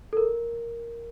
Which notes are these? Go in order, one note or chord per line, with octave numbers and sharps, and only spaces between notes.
A4
A#4